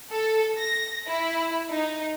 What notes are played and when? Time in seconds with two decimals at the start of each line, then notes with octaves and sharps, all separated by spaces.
0.11 A4
0.58 A#6
1.06 E4
1.71 D#4